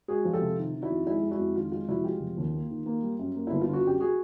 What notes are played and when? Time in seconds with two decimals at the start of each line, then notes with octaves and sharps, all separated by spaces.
0.08 G#3 F#4 G#4
0.25 F3
0.33 G4 A4
0.41 C3
0.58 D#3
0.74 D#3
0.82 E4 F#4
0.90 F2
1.06 G#3 E4
1.23 G#3
1.31 E4 F#4
1.39 F2
1.56 D#3 F4
1.72 G#3 F4
1.88 F1 E4 F#4
2.04 G#3 F4 G4
2.20 F1
2.37 D#2
2.54 A#3
2.70 D#3
2.86 A#3
3.02 G3
3.19 F#2
3.36 A#3
3.47 G1 E4
3.61 F4
3.68 D3
3.73 F#4
3.85 F#2 G4
4.00 F#4 G#4